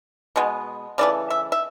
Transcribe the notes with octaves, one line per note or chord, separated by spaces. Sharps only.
B2 G#3 B3
C#3 E3 A3 D5
E5
E5